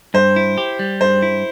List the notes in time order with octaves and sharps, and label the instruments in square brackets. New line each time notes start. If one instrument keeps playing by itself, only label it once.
[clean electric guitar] G2 [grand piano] C5
[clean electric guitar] E4
G4
G3
[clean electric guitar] G2 [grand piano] C5
[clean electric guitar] E4